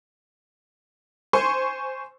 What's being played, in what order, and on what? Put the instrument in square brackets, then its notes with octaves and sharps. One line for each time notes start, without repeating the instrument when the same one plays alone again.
[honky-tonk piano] C5 G#5 C6 C#6